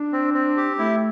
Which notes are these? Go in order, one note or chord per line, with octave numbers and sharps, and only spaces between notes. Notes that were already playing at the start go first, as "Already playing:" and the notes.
Already playing: D4
C4
C4
G4
A3 E4